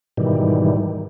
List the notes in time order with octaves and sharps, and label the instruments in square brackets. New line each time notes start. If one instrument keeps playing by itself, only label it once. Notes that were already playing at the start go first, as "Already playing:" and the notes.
[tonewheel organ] G#2 B2 D#3 E3 G3